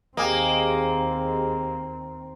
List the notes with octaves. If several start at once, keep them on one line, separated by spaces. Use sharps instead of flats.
D#2 A#3 C4 G4 G#4 D#5